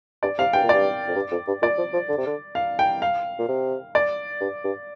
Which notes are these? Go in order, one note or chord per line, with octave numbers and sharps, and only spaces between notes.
G2 D5
C3 F5
G2 G5
A#2
G2 D5
F2
G2
F2
G2
A#2 D5
F3
F3
D3
C3
D3
F5
G5
F5
A#2
C3
D5
G2
G2